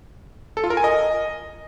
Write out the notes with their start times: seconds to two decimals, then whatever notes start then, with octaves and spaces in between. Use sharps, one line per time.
0.57 A4
0.64 F4
0.70 A#4
0.77 G#5
0.84 D#5